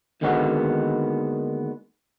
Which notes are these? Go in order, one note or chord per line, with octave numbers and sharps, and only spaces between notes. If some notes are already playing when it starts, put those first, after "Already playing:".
D#2 D3 D#3 G#3 B3 F#4